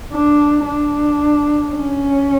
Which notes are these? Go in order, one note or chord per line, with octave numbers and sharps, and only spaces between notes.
D4
D4
C#4